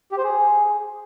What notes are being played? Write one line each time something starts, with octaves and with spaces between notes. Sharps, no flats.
G4
C5
G#4